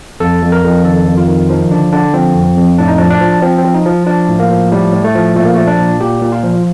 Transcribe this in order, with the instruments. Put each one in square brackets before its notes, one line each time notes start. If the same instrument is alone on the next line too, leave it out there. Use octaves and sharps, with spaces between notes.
[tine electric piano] F2 A4
F2
A#4
F2
D#3 A4
F2
F4
D#3
F3 D#4
D3 D4
D3 D4
F3 C4
F2
F2
A2 D4
D#4
F3 D4
D4
F3
F3 C4
C4
F3
D#4
F3
F3 D4
A2
A#3
F3
A2 G3
A2
A3
F3
A#2 A3
A#3
F3 A3
D4
A#2
A#2 G4
A#2
F4
F3